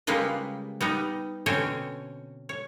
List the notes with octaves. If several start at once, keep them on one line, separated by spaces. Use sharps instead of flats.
C#3 G3 G#3 A#3 F4 B4
G3 B3 D#4
B2 D3 C4 C#4 C#5 G5
C#5